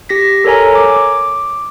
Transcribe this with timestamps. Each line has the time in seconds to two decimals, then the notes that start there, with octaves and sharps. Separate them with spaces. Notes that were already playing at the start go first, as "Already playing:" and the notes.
0.09 G4 A#6 B6
0.44 A4 A#4 C#5 G#5 A#5
0.75 D6